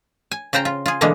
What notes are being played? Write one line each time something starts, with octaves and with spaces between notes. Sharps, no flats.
G#5
C#3 F4 C5 G5 A#5
F4
F4 G#4
B2 D3 E3 G#3 A#3 B3